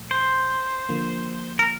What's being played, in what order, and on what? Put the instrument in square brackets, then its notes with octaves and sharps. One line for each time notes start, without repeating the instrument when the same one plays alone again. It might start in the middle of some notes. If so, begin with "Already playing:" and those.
Already playing: [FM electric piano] A#2 F3 A3
[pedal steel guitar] C5
[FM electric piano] D3 F3 A#3
[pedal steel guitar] A#4